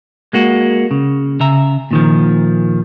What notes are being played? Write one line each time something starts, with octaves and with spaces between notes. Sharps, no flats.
G#3 A#3 F#4
C#3
C#3 E5 A#5
A#2 D#3 F3